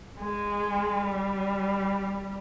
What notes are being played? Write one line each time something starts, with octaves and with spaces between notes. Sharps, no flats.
G#3
G3